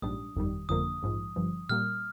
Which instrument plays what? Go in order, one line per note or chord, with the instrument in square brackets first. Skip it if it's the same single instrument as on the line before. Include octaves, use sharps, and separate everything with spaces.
[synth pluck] A#1 G#2 G3 D4 [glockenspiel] D#6
[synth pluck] G1 F2 D#3 G3
[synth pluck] G1 F2 D3 F3 A#3 [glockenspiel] D#6
[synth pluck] A#1 G#2 F3
G1 G2 F3
[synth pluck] A#2 G3 A#3 [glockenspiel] F6